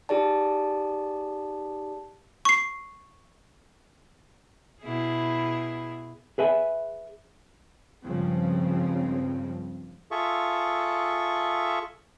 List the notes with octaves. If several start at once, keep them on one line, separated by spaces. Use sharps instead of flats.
D#4 G4 G#4 D5 A5
C#6 C7
B2 E4 G#4
G#4 B4 E5 G#5
C#2 G2 C#3 F3 G#3 C4
F4 G#4 A4 E5 C#6